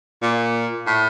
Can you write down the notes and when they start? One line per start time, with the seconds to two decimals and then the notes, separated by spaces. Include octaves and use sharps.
0.22 A#2
0.87 A2